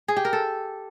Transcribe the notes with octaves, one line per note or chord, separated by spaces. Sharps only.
G#4
G4
A#4
A4